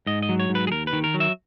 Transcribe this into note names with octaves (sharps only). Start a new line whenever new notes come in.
G#2 D#5
D#5
F#3
C#5
G#2
B4
G#4
D#2 A#4
B4
D#3
A#4
F#3
E5